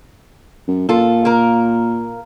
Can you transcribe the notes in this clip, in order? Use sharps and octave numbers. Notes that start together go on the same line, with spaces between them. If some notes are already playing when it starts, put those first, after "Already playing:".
F#2
A#2 F4 A4
A#3 A#4